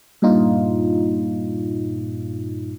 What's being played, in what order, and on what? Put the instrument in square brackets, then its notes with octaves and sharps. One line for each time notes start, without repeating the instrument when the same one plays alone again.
[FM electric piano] G2 A#2 D#4 F4